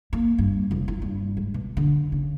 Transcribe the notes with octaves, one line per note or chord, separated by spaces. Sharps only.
A#3
G2
F1
E4
G2
G#2
B2
D3
C#3